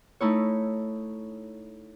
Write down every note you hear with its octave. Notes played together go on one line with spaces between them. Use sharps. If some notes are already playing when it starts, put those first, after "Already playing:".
A3 D#4 E4 C#5